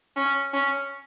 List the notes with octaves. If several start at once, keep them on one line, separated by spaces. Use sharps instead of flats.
C#4
C#4